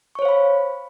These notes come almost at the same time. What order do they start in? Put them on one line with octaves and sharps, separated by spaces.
C#6 C#5 C5 F5 B5